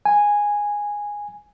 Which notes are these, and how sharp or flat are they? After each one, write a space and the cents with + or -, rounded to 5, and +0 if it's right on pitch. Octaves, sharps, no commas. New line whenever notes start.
G#5 -10